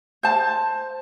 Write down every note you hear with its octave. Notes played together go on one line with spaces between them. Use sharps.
C5 A5